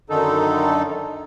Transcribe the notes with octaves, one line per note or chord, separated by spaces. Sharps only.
F#2 D3 D#3 D#4 A4